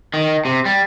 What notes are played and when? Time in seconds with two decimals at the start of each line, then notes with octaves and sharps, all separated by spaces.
0.14 D#3
0.45 C3
0.65 G3